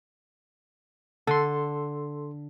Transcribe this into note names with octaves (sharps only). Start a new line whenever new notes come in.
D3 A4 C6